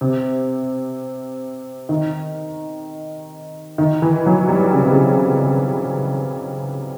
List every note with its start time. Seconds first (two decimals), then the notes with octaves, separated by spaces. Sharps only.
0.01 C3
1.89 D#3
3.78 D#3
4.02 E3
4.26 F#3
4.49 G3
4.73 C#3
4.82 C3
4.92 C#3